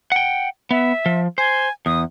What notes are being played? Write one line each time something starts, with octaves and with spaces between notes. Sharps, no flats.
F#5 G5
B3 E5
F3
C5 G#5
E2 D#6